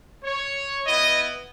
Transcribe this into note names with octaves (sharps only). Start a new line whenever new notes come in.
C#5
B3 E4 D#5